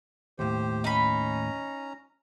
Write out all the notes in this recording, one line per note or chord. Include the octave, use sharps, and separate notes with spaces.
D#2 A2 G4 C5
C#4 D#4 A#5 B5